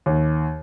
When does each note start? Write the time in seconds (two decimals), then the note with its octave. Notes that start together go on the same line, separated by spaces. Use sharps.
0.06 D#2